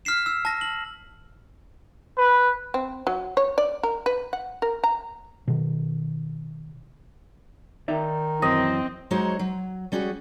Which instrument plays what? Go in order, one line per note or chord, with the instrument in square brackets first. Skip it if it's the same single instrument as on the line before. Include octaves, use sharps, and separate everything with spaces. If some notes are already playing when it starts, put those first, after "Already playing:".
[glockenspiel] F6 B6 C7 E7
E6
A5 A#6
F#7
[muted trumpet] B4
[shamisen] C4
F#3
C#5
D5
A#4
B4
F#5
A#4
A#5
[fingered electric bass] B2 D#3
[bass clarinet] D#3 [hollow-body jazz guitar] D#4 D5 E5
[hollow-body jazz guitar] F#2 E3 [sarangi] C4 [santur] D#5
[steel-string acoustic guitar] F#3 G#3 D#4 F#4 C5 C#5
F#3
G3 C#4 F#4 G#4